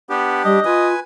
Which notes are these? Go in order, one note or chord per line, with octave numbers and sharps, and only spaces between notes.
B3 D4 G4
G3 D#5
F4 B4 G#5